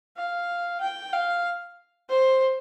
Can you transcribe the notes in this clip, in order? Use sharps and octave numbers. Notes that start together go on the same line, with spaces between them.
F5
G5
F5
C5